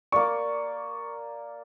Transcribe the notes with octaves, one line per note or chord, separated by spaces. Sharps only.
A#3 D5 C#6